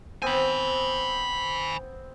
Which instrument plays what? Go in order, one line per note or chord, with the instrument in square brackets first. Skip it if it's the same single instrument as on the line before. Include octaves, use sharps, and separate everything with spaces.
[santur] B3 C4 C5 [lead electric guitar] G#5 B5